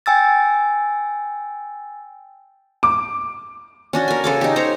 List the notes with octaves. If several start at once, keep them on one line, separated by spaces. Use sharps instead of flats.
G5 G#5 E6 A6
D6
C#4 D4 F#4
A#4 G#5
C#3 A4 D6
D#4 G4
C5 C#5 A#5